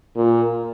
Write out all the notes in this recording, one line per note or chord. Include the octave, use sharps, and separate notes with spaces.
A#2